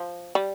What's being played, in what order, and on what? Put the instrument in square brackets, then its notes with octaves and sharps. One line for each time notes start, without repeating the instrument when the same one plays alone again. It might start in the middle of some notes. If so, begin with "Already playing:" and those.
Already playing: [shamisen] F3
G3